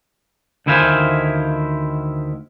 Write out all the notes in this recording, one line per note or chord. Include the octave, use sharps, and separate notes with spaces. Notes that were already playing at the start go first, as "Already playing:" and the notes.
D2 D#3 E4 C5 F5 G#5